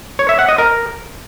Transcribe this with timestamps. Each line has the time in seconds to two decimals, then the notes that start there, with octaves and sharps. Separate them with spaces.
0.19 C#5
0.29 E5
0.39 F#5
0.49 D#5
0.58 A#4